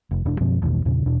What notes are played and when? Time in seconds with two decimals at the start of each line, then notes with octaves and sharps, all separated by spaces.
0.11 F1
0.25 E1 D4
0.40 F#2 B2 F3 C4
0.62 A1 E2 B2 D#3
0.85 E2 A#2 C#3
1.06 E2 B2 D4